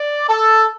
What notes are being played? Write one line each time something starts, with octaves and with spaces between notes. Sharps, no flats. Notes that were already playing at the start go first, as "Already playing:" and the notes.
Already playing: D5
A4